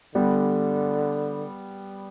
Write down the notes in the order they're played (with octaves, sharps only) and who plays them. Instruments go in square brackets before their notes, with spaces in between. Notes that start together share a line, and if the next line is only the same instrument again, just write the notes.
[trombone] D3 [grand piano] G3 B3